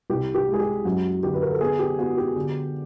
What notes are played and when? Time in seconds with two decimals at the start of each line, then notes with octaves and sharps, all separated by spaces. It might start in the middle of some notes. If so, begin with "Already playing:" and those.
0.10 C2 G4
0.35 G4
0.48 G#3
0.54 G#4
0.60 G4
0.85 F#2 F#4
1.23 D3 G4
1.34 B4
1.42 A#4
1.52 A4
1.61 B3 G#4
1.79 G4
1.99 B3 F#4
2.17 G4
2.36 D3